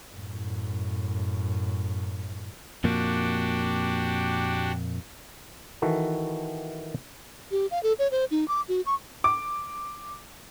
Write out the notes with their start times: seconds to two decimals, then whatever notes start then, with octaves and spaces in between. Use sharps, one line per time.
0.12 F#2 A2
2.84 F2 A#2 A#3 D4 F#4 G4
5.82 D#3 E3 F#4 A4
7.51 G4
7.71 F5
7.83 A4
7.99 C#5
8.11 C5
8.31 D#4
8.48 D6
8.69 F#4
8.86 C#6
9.24 D6